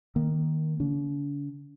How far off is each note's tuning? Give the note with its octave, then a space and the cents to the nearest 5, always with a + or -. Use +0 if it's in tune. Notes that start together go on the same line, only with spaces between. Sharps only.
D#3 +0 A#3 +10
D3 -45 D4 -45